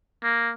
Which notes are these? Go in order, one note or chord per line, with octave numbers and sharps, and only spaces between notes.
A#3